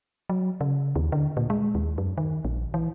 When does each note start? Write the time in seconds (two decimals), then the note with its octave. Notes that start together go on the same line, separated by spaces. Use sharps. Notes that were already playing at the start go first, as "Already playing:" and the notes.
0.30 F#3
0.61 C#3
0.96 D#2
1.12 D3
1.37 A#2
1.50 G#3
1.75 D#2
1.98 F#2
2.18 D#3
2.45 A#1
2.74 E3